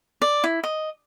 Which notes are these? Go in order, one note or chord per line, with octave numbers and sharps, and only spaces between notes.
D5
E4
D#5